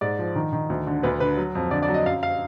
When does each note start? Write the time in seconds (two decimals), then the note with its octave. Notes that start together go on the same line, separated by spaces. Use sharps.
0.01 G#2 D5
0.19 F3
0.35 D#3
0.53 D#3
0.70 D2
0.87 D3
1.03 D2 B4
1.20 D3 B4
1.37 F#3
1.55 F2
1.71 D3 D5
1.83 D5
1.89 F#3
1.94 D#5
2.06 F#2 F5
2.23 F5